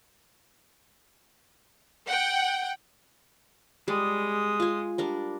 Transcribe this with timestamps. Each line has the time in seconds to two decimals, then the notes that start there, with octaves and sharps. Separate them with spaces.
2.07 F#5 G5
3.88 G3 G#3 G#4 D5 D#6
4.60 F4 G#5
4.98 G3 D4 A#4